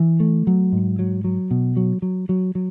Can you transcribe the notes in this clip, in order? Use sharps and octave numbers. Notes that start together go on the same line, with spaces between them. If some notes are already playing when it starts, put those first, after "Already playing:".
Already playing: E3
A3
F#3
G#2
F#3
F#3
B2
F#3
F#3
F#3
F#3